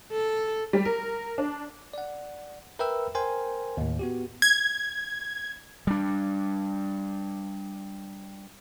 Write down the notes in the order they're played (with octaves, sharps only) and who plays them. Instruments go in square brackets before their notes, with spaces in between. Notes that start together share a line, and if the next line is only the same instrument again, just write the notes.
[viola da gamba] A4
[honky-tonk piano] G3
A#4
D4
[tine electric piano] D5 F#5
A#4 B4 E5 G5 B5 E6
A#4 C5 G5 G#5 C6
D#2 A2
B3 F#4 G4
[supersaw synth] G#6
[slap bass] G3 D4